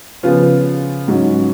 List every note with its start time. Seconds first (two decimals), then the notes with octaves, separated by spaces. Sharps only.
0.23 C#3 F3 B3 F4
1.08 G#2 F#3 C#4 F#4